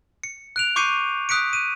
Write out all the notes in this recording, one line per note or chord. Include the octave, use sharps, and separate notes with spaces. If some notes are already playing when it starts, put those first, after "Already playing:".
C#7
F#6 D7 F7
C#6 D6 G6 C7 C#7 D#7
D#6 F#6 B6 C#7 D7
D#7